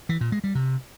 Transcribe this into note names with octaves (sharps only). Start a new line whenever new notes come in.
E3
A#2
G#3
G3
C3